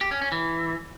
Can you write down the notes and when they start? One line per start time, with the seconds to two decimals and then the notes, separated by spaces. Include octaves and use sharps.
0.01 G4
0.11 C#4
0.22 C#4
0.32 E3